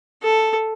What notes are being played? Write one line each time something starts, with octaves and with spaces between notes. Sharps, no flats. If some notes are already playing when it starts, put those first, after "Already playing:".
A4